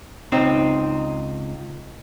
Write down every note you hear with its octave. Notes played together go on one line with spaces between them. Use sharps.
C#2 C4 D#4